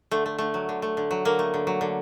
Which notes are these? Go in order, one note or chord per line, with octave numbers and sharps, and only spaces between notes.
D3 A3
A3
D3 A3
F#3
D3
A3
D3
F#3
D3 A#3
A3
D3
F#3
D3